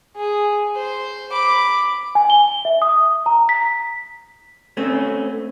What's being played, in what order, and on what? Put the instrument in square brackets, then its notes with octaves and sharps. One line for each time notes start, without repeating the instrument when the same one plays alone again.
[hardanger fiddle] G#4
C5
B5 D6
[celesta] G#5
G7
E5
D#6
A#5
B6
[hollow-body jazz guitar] A3 C4 C#4